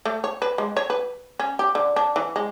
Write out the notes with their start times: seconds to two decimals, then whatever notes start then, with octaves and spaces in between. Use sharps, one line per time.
0.05 A3
0.24 C#5
0.42 B4
0.58 G#3
0.77 C#5
0.90 B4
1.39 C#4
1.59 G4
1.75 D3
1.96 D4
2.16 E3
2.36 G#3